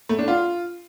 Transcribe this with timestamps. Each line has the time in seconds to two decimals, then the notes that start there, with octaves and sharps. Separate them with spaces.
0.09 A3
0.19 D4
0.28 F4